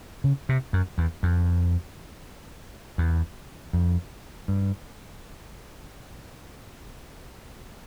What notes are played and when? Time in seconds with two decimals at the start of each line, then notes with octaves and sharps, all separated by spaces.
0.24 C#3
0.49 C3
0.73 F#2
0.98 E2
1.23 F2
2.98 E2
3.73 F2
4.48 G2